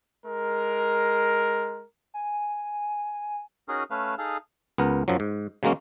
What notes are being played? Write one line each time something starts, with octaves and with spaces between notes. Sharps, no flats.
G#3 A#4
G#5
C#4 D#4 F#4 G#4 A#4
A3 C#4 B4 F5
D#4 G#4 A4 F5
C#2 B3 A#4
F#2 F3 F#3
G#2
C#3 F#3 G#3 A#3 C#4